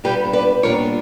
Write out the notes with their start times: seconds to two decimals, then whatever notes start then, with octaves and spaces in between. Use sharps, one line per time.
0.04 A#2 G3 B3 D4 G4 B4
0.33 B4 D5
0.63 A#2 G3 B3 D4 A#4 C#5